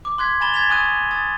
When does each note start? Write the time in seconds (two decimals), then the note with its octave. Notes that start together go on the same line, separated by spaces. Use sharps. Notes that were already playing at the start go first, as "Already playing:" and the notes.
0.05 D6
0.18 C6 F#6 G#6 B6
0.41 G#5 B5 A6 E7 G7
0.54 G#6 A6 B6 E7 F7
0.69 G#5 C#6 D#6 F#6 D#7
1.11 D#6 A6